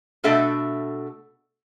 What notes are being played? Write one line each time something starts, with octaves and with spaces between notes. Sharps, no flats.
B2 A3 D4 A4 E5